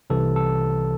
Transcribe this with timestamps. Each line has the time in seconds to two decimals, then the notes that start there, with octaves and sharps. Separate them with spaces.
0.10 C2 C3 E3 A4
0.36 A4